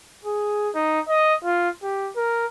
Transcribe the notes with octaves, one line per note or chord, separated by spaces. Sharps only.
G#4
D#4
D#5
F4
G4
A#4